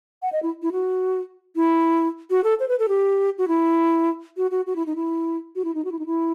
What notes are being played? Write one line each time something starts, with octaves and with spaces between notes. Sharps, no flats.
F#5
D#5
E4
E4
F#4
E4
F#4
A4
C5
B4
A4
G4
F#4
E4
F#4
F#4
F#4
E4
D#4
E4
F#4
E4
D#4
F#4
E4
D#4
E4